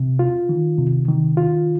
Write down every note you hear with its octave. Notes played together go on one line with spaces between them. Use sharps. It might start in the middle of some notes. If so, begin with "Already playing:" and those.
Already playing: C3
F4
D#3
C3
D#3
F4